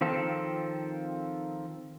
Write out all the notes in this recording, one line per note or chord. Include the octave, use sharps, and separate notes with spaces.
D#3 F3 C4 F4 A4